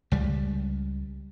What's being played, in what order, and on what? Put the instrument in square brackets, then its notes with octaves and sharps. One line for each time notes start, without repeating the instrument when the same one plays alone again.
[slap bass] C#2 G3